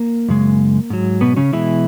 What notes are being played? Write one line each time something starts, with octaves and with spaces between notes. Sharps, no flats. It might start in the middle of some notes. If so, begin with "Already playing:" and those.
Already playing: A#3
F#2 C#3 G#3
G#2 F#3
B2 B3
C#3 C#4
B2 E3 G#3 E4